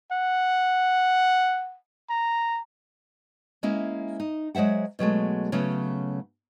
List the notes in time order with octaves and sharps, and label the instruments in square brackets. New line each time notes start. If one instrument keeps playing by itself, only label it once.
[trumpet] F#5
A#5
[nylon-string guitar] G#3 A#3 C#4 E4 E5
D#4
F#3 G#3 C5 E5 F#5
B2 F#3 G#3 A3
C#3 F#3 A3 B3 C#4